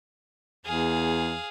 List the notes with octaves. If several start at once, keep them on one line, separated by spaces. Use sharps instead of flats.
E2 G#4 F5